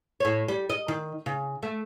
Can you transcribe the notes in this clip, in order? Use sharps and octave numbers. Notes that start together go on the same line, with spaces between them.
A2 C#5
G3
D#5
D#3
C#3
A3